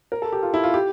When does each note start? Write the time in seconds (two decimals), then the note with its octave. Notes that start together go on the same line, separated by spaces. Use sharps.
0.12 A#4
0.22 A4
0.32 G4
0.43 F4
0.54 E4
0.64 F4
0.74 G4